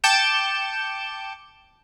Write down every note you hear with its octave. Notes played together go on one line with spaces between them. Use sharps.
G5 A5 D6 G6 C#7 E7